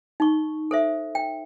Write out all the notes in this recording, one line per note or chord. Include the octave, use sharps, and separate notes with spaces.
D#4 C#6
A4 C5 E5
G5